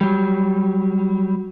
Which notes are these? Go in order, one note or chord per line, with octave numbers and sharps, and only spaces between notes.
F#3 G3